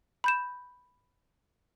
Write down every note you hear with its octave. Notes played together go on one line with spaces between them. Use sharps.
B5 G6 E7